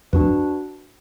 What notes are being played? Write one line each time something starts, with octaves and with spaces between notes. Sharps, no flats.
F2 D4 F#4 B4